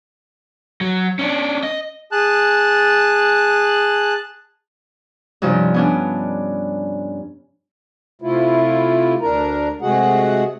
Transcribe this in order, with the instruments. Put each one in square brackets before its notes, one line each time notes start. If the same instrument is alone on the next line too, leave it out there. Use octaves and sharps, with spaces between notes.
[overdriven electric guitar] F#3
C#4 D4
D#5
[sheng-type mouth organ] G#4 A5 F#6
[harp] G2 C3 F3 C#4 D#4
B3 C#4 D4
[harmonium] C3 A3 E4 F4
D2 D4 A#4 A#5
C3 G#3 A3 F#4 G#4 F#5